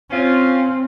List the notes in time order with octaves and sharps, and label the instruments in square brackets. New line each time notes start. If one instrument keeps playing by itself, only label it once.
[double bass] C4 [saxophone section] C#4 F4